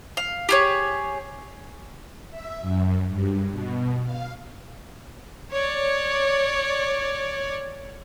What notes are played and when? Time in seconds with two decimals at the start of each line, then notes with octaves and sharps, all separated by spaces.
0.17 F5
0.49 G4 G#4 C#5
2.30 E5
2.61 F#2
3.09 G2
3.52 B2
4.04 F5
5.53 C#5 D5